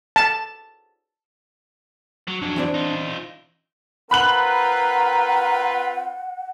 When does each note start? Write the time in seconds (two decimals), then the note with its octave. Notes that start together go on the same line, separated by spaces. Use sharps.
0.16 A5
2.28 F#3
2.42 F2 F#3 D4
2.56 E3 C4 D5
2.74 D#4 F4
4.11 C4 F4 A#4 B4 F#5 B5 F#6 F#7